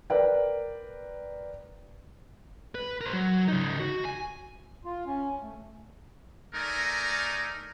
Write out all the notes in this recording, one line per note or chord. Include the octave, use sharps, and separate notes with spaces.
A#4 B4 D5 G5
B4
A#4 C5
F#3
C#3 D#4
F#4
G#5
F4
C#4
A3
A3 D#4 A#4 D5 G#5